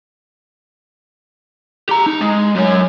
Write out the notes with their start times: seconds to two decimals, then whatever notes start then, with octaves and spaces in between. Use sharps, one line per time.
1.89 G4 A#5
2.06 D#4
2.21 G#3
2.56 F#2 C#4